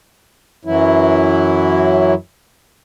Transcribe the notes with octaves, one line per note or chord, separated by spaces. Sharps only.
F#2 E3 F#3 E4